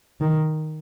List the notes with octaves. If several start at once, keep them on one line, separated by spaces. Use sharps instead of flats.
D#3